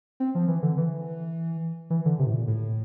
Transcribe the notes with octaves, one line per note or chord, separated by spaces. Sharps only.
C4
F3
E3
D3
E3
E3
D3
C3
A2
A#2
A2